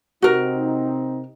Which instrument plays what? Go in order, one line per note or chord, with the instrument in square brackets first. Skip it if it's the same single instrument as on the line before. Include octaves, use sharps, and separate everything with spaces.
[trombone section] C3 C4 D#4 [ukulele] F#4 A#4